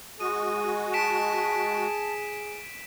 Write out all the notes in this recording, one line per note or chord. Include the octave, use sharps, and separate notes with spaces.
G#3 F#4 G#4 D#6 D#7
A5 B6 D7 E7